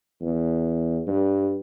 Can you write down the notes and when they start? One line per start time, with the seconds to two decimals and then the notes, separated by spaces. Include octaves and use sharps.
0.22 E2
1.07 G2